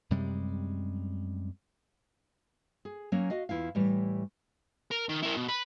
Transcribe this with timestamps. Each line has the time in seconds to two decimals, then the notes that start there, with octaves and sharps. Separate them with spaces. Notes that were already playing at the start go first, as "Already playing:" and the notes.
0.10 F#2 C3 G3 G#3
2.85 G#4
3.12 F#3 A#3 C#4
3.30 F#4 D#5 F5
3.49 E2 E4 F4 F5
3.75 A2 E3 G3
4.91 A#4
5.09 D#3
5.22 E4 A#4
5.37 B2
5.48 B4